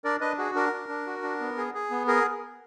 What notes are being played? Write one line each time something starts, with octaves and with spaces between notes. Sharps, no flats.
D4 A#4 D5
D4 B4 D#5
F#4 G#4
D4 A#4
D4
D4
F#4
D4
B3
G#4
G#4
B3
G#4 A#4